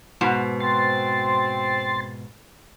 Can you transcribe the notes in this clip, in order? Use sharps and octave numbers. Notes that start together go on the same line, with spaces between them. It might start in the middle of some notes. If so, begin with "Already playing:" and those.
G#2 B2
C4 C6 A6